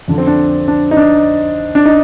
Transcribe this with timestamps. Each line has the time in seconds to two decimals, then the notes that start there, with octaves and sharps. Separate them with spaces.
0.08 F2 D3 D4
0.18 C4
0.27 D4
0.68 D4
0.91 D#4
0.97 D4
1.75 D4
1.85 D#4